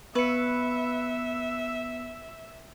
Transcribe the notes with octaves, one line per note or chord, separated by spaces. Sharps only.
B3 B4 E5 C#7